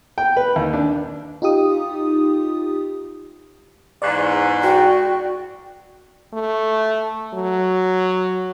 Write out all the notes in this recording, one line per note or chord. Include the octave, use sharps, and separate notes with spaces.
G5
B4
D#2
D4
D#4 F4 G4 D#6
E2 G#2 D5 C#6 F#6
F#4 G5
A3
F#3